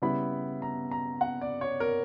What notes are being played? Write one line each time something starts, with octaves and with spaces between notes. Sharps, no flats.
C#3 G3 B3 E4 B5
A#5
A#5
F#5
D5
C#5
A#4